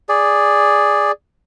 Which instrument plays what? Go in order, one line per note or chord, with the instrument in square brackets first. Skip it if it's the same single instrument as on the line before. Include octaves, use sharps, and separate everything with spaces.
[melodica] G#4 D5